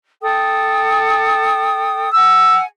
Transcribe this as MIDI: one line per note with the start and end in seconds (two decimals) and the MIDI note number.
0.21 2.09 69
0.21 2.09 79
0.21 2.09 87
2.13 2.66 78
2.13 2.66 80
2.13 2.57 88